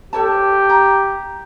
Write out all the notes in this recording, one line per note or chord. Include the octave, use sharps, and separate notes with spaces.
G4 A4 C#5 A5
A#5